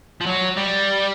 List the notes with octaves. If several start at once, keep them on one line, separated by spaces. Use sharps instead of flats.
F3
F#3
G3